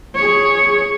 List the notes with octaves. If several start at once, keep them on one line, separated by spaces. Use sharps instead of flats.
G#4 C#5